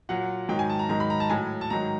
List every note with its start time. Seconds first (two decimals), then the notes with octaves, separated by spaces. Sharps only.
0.09 A#2 F#3 F#5
0.49 G#2 D#3 F#3 G5
0.59 G#5
0.70 A5
0.79 A#5
0.89 G#2 D#3 F#3 A#5
1.00 B5
1.10 A#5
1.20 A5
1.30 A2 F#3 G#5
1.61 A5
1.70 G#2 D#3 F#3 A#5